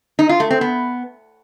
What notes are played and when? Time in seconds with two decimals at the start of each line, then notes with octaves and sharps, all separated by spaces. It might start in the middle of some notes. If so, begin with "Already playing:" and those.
0.19 D#4
0.29 F4
0.40 A3
0.51 C4
0.61 B3